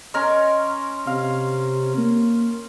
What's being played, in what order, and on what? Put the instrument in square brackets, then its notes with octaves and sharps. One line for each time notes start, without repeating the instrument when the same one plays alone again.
[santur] C#4 A#4 D#5 [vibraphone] C6
[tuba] C3 [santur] F5
[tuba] A#3